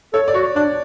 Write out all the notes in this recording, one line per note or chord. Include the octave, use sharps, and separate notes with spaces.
A4 C#5
D5
F#4 C#5
D4 D5